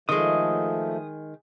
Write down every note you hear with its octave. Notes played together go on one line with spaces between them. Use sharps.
D#3 F3 G#3 A3 D#6